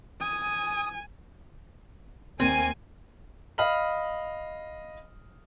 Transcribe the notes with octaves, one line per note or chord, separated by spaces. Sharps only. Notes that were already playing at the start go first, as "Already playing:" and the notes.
G#5 D#6
D#2 A#3 C4 G#5
D#5 F5 B5 F6 F#7